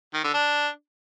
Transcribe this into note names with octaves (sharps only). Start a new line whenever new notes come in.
D#3
D3
D4